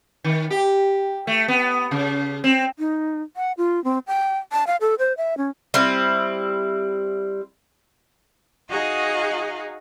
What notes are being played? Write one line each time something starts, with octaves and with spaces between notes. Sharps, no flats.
D#3
G4
A3
B3
C#3
C4
D#4
F#5
F4
C4
G5
A5
F5
A4
C5
E5
C#4
G3 C4 E4
D#4 F#4 G#4 D#5 F5